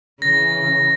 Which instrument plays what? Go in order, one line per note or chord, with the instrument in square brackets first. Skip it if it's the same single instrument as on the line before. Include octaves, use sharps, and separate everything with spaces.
[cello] C#3 E3 [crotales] A#6